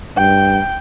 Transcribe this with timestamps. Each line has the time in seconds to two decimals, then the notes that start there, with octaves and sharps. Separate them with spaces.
0.17 G2 G5